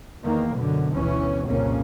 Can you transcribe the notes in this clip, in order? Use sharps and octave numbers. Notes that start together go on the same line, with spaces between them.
E2 D#3 A#3
F#2 B2 D3
G1 D2 B2 E3 C#4
C2 F2 A#2 C#3 A#3 C#4